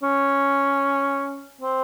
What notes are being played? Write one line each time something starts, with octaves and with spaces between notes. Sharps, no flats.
C#4
C4